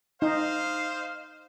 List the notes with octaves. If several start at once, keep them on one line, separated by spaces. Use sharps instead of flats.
D#4 C5 D#5 F5